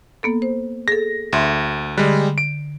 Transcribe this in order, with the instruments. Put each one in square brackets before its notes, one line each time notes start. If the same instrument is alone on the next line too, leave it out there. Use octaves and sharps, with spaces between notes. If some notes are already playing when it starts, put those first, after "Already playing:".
[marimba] A#3 B3 A4
C5
[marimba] G#4 A4 [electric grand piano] A#6
[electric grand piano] D2 [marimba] E5 C6
[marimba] D3 [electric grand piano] G3 G#3
[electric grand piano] D7